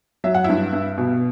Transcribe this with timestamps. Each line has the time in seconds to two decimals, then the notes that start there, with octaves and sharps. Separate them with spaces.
0.24 F#3 E5
0.34 F#5
0.44 G2 E4 E5
0.73 G2
0.98 B2